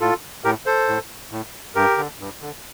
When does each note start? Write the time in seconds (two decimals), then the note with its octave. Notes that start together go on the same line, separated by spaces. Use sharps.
0.01 A2 F4 A4
0.44 A2 G4 A#4
0.66 A4 C5
0.88 A2
1.31 A2
1.75 G2 G4 A#4
1.98 D3
2.19 G2
2.41 D3